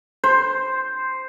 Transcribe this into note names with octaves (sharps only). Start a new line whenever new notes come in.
C5